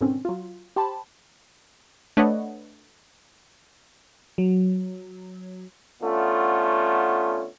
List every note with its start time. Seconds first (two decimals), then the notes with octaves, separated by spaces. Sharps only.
0.01 G#2 B2 D3 D#3 C4 C#4
0.25 F#3 F4
0.76 G4 C5 A5 B5
2.17 A3 D4 B4 C#5 D#5 F#5
4.38 F#3
6.02 D3 A3 B3 C#4 F4